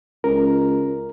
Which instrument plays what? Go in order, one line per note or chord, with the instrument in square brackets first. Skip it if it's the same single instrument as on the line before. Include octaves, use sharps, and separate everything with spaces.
[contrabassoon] C#2 [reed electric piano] A#4